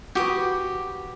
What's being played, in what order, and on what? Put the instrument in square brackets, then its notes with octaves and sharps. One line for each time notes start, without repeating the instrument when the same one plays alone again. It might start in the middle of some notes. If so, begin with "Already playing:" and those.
[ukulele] F#4 B4 [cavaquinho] G4 D#6